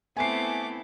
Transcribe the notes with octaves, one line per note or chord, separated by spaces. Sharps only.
A3 B3 C4 E4 G#5 D6 C7